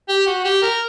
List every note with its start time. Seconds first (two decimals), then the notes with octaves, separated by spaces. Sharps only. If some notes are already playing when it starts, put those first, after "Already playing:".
0.09 G4
0.27 F#4
0.45 G4
0.62 A#4